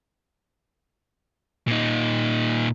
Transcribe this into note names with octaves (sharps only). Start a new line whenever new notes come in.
A#2 D#4